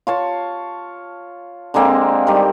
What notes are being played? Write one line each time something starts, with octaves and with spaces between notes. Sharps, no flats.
F4 C#5 A5
D3 G#3 A#3 C4
D#3 G3